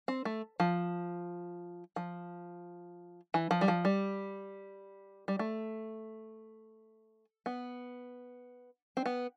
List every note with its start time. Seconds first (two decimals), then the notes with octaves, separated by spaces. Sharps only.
0.08 C4
0.25 A3
0.60 F3
1.96 F3
3.34 E3
3.51 F3
3.61 G3
3.68 F3
3.85 G3
5.28 G3
5.39 A3
7.46 B3
8.97 C4
9.06 B3